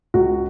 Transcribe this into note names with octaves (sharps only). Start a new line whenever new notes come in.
C#2 F#4